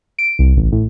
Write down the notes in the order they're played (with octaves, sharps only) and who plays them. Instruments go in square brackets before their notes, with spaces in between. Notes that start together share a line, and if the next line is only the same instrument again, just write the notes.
[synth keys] D7
C2
A1
A2